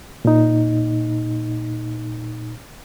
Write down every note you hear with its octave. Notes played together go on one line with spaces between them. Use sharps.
A#2 D#4